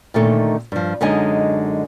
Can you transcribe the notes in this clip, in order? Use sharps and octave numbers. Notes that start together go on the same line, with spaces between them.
A#2 D3 D#3 A3 D#4
G2 F3
F#2 D3 G#3 D#4 D#5 G#5